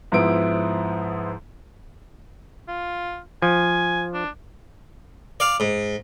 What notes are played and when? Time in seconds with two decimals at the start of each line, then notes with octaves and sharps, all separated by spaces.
0.12 G#2 F3 B3 E4 D7
2.68 F4
3.42 F3 G#5
4.14 D4
5.40 D5 F5
5.60 G#2